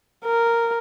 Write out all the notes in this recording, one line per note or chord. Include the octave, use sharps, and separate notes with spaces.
A#4